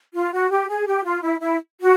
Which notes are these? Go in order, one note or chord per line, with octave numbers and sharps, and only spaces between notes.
F4
F#4
G4
G#4
G4
F4
E4
E4
F#4